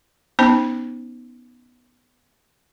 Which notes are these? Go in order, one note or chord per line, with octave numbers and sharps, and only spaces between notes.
B3 C#4 D#4 C5 A5